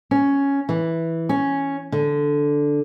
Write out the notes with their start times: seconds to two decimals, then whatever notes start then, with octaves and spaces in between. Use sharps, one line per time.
0.11 C#4
0.69 E3
1.29 C#4
1.92 D3